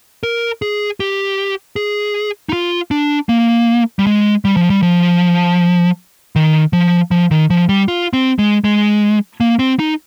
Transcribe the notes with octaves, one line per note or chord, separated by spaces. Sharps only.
A#4
G#4
G4
G#4
D#4
F4
D4
A#3
G3
G#3
G3
F3
G3
F3
D#3
F3
F3
D#3
F3
G3
F4
C4
G#3
G#3
A#3
C4
D#4